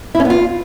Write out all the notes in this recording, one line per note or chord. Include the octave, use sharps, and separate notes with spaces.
E4
C#4
B3
F4